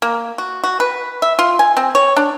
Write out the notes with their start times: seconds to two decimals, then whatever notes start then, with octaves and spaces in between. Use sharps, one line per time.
0.02 A#3
0.38 F#4
0.64 F#4
0.80 B4
1.22 E5
1.39 F4
1.59 G#5
1.77 C4
1.95 C#5
2.17 D4